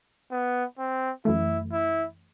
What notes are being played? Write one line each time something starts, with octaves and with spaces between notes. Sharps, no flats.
B3
C4
F#2 E3 A3 E4
E4